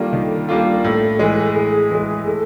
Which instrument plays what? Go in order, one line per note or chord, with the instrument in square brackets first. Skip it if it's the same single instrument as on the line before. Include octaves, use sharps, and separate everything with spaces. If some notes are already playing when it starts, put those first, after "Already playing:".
Already playing: [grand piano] D#3 G3 A#3 D4 F4 [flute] A4
[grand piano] D#3
G3 A#3 D4 F4
[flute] A#4
[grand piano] A2 [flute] A4
[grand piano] E3 G#3 [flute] A4
[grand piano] A2 [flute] G#4
[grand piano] E3 G#3
[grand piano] A2 [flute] A4